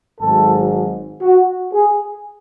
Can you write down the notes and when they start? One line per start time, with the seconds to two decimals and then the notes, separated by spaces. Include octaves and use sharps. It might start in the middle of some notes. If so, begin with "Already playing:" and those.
0.20 G#1 G#2 F#3 A4
1.22 F#4
1.73 G#4